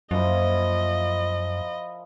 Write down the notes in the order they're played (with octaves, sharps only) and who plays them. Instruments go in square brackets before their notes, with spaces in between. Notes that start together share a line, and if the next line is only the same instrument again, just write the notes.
[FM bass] F#2 [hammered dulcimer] F3 A#3 E4 [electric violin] D#5